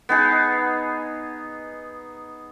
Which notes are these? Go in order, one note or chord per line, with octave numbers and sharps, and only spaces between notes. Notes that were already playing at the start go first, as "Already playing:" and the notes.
B3 D#4 G#4